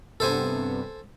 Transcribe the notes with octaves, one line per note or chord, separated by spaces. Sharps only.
G2 C3 B3 A4 C5 G#5